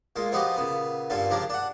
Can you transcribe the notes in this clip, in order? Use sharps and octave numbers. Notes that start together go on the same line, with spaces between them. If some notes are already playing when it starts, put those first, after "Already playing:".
A#2 G#3 F4
F3 B3 D#4 F#4 G4
A#2 C#3 B3
G2 A#2 D3 C#4 F4
C#3 F3 D4 G4 A#4
D4 F#5